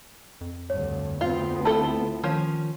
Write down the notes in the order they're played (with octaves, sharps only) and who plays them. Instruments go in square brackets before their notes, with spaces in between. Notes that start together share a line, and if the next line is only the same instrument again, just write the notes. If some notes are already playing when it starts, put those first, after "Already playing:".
[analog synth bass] F2
[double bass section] D2 G2 D3 [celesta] C#5
[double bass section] D2 B3 C4 [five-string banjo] F4
[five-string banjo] E4 F4 A4 [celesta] A5 G7
[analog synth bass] D#3 [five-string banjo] F3 C#4